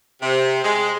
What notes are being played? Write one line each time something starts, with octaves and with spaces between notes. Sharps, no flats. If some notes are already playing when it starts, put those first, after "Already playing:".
C3
G#3